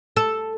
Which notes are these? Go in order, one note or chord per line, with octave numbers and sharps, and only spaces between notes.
A4